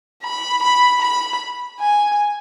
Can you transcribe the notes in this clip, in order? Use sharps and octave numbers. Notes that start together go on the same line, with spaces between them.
B5
B5
B5
G#5